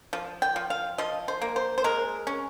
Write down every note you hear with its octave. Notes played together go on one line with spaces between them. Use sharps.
F3
G5
F3
F5
F3 D#5
C5
A#3
C5
C5
G#3 A#4
C#4